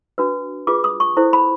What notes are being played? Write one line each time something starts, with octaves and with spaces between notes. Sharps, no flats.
D4 F#4 B4
F4 G#4 B4 D6
D#6
C#6
E4 A4 C5
B5